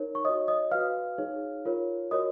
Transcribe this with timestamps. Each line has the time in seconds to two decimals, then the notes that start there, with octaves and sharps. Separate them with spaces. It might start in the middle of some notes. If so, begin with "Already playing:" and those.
Already playing: D#4 A#4 C#5
0.15 C#6
0.25 F#4 C#5 D#5 D#6
0.48 D#5 D#6
0.71 F#4 B4 F5 F6
1.18 D#4 G#4 C#5
1.65 F4 A#4 C#5
2.11 F#4 A#4 C#5 D#5 D#6